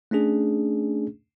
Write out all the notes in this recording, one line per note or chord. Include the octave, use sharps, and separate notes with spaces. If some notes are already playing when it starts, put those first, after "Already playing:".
A3 C#4 D4 G#4